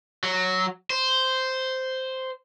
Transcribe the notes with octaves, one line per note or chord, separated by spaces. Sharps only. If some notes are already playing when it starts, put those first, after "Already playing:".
F#3
C5